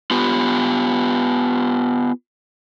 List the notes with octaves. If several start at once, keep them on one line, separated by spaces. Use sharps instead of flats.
B3 F4 G4